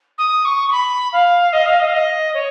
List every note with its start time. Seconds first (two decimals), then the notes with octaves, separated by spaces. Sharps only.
0.18 D#6
0.45 C#6
0.68 C#6
0.72 B5
1.13 F5
1.53 D#5
1.66 F5
1.80 D#5
1.87 F5
1.94 D#5
2.34 C#5